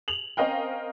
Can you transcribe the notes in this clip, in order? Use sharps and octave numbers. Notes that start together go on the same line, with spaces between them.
F7 F#7
C4 C#4 A#4 D#5 F5 G5